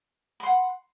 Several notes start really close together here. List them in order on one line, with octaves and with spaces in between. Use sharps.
B5 C6 F#5